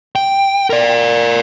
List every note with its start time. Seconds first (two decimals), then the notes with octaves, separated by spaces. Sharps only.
0.15 G5
0.70 A#4 D5